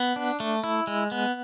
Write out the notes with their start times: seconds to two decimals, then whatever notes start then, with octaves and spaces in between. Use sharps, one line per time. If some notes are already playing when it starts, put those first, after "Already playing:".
Already playing: B3
0.16 D4
0.40 A3
0.64 E4
0.87 G#3
1.12 B3